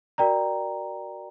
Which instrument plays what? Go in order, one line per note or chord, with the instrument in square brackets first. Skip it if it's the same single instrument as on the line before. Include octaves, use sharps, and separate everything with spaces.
[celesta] F#4 A#4 D5 G5 A#5